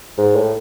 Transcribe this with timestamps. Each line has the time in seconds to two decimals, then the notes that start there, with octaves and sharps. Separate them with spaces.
0.18 G#2
0.36 A2